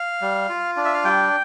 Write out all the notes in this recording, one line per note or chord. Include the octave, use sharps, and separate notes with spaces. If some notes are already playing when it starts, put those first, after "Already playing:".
Already playing: F5
G3
F4
D4
E5
F5
G3 G5